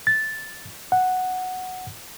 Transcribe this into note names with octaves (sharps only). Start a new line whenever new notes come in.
A6
F#5